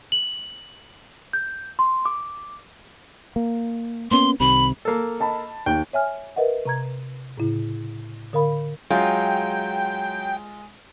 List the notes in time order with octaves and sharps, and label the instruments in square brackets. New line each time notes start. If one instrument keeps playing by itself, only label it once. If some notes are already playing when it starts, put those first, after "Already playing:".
[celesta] F#7
G6
C6
D6
[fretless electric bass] A#3
[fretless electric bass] A#3 B3 C#4 [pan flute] C6
[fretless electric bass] C2 C3 D#3 [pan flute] B5
[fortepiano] A#3 A4
[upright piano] D#5 A5 B5
[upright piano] D#2 [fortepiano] G5
[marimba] C#5 E5 G#5 F6
A#4 B4 D#5 E5 F#5
C3 A#5 G#6
A2 C#3 E4
D3 A#4 F5 B5
[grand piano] F#3 [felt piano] G#3 [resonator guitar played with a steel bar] F4 [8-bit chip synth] G5